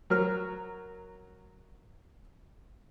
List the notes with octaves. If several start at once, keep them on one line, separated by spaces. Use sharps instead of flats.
F#3 A#4 F6